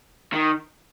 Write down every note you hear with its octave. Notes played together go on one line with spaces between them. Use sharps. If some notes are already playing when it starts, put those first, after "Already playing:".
D#3